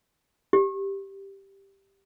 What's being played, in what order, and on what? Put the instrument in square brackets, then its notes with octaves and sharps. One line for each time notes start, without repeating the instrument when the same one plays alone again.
[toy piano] G4